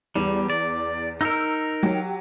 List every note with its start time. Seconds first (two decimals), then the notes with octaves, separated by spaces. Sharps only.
0.15 E2 G3
0.50 D5
1.21 D#4 A#4 E6 G6
1.83 F#3 G4